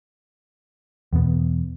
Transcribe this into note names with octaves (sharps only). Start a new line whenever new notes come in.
E2 B2 B3